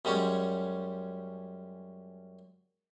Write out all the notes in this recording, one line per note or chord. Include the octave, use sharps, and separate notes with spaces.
F#2 G3 G#3 C#4